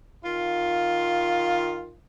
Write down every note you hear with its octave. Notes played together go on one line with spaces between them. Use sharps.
D#3 F4